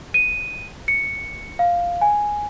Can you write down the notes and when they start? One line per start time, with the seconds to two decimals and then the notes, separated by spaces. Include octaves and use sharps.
0.14 D#7
0.88 C#7
1.59 F5
2.01 G#5